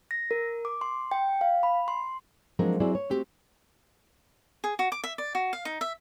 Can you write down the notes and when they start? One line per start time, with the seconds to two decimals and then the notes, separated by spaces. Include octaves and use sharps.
0.11 A#6
0.31 A#4
0.65 D6
0.81 C6
1.11 G5
1.41 F5
1.63 B5
1.88 C6
2.59 F3 F#3 G#3 C4 D4 A#4
2.80 F#3 C4 E4 G#4 D5
2.95 C#5
3.10 A3 C4 F#4 G4
4.64 G#4
4.79 F#4
4.92 D6
5.04 E5
5.18 D5
5.35 F#4
5.53 F5
5.65 D#4
5.81 E5